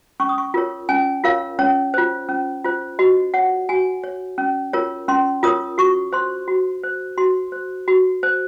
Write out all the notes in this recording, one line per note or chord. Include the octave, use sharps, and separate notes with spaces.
C#4 C#6
D#6
C#6
F4 A#4 C#5
C#4 G#5
F4 A#4 C#5 F5
C#4 C#5
F4 C5
C#4
F4 C5
F#4 D#5
C#5 F#5
F#4 G#5
C#5
C#4
F4 A#4 C#5
C#4 C6
F4 A#4 C#5 D#6
F#4 C#6
C5 C6
F#4
C5
F#4 C6
C5
F#4
C5